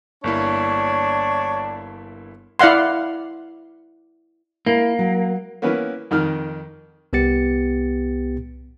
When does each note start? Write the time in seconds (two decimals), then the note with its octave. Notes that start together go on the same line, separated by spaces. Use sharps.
0.24 G1 A#3 D4 E4 C#5
2.59 E4 D5 F5 F#5 C6
4.66 A#3 E4
4.99 F#3
5.62 A#3 B3 C#4 E4 B4
6.11 F2 D#3 D#4 F6
7.13 C2 B3 G4 A6 C#7